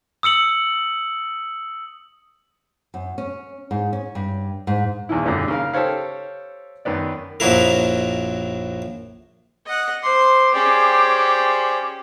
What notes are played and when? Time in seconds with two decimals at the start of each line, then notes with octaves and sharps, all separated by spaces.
0.23 D#6 E6 C#7 F#7
2.94 F#2
3.18 C#4
3.71 G#2
3.93 C#4
4.15 G2
4.67 G#2
5.09 B1 E2 E3 E4
5.25 F#2 A#2 D3 G3
5.48 C#3 A#4 F5
5.74 G4 A4 C5 C#5 F5
6.85 F#2 D#3 B3 D5
7.40 A#1 F#2 F3 F#3 E4 A#4
9.66 D#5 F#5
10.03 C5 C6 D6
10.54 C#4 G4 G#4 C5 D5